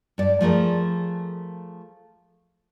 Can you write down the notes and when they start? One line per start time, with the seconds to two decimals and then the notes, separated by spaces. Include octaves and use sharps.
0.18 G2 D5
0.41 F3 A3 G#4 A#4